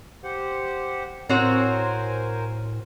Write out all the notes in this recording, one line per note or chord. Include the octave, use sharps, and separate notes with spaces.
G4 C5 F#5
A2 C4 F#4 A#4 C5 C#5 G#5